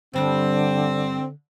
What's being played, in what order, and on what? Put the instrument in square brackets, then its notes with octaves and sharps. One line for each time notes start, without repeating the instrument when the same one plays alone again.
[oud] G2 G3 D4 [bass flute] D3 [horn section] C4